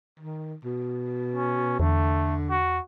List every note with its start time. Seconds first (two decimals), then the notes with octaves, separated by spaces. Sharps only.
0.20 D#3
0.65 B2
1.35 C#4
1.79 E2 D3 A3
2.50 F#4